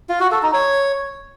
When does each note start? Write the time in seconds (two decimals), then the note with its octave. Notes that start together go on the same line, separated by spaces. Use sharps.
0.09 F4
0.20 F#4
0.31 A4
0.43 D#4
0.54 C#5